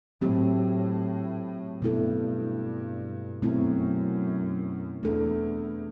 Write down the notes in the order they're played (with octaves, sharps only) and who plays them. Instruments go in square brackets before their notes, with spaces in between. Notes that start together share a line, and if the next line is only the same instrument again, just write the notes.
[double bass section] A2 [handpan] F#3 C4 G4
[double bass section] G2 [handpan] B2 A3 E4 A4
[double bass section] F#2 [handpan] B2 A3 C4 E4
[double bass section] E2 [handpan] A3 D4 A4